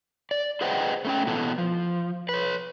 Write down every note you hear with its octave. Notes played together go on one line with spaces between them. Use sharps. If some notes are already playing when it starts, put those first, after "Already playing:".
D5
G#4 B4 C5 D#5 F#5 G5
A3 C#4 G5
B2 E3 B3 A4
F3
B4 C#5